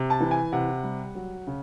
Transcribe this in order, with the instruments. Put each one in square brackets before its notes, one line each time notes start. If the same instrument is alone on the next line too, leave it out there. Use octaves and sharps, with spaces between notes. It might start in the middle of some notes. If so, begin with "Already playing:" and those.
Already playing: [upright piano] C3
A5
E3
G#5
C3 F#5
G3
F#3
C#3